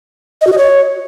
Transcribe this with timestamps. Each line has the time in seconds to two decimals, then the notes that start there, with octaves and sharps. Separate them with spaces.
0.41 D#5
0.47 F#4
0.52 D#5
0.58 C#5